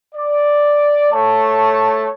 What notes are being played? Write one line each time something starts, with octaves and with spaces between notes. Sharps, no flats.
D5
A3 C#5 A5